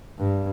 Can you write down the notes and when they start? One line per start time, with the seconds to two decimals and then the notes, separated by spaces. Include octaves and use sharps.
0.19 G2